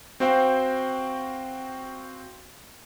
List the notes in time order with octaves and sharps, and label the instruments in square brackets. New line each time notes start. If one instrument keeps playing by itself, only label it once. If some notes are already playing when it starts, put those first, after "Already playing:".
[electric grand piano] C4 F#4 C5 F5 G5